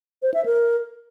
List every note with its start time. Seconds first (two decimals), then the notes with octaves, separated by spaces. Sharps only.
0.22 C5
0.34 E5
0.46 A#4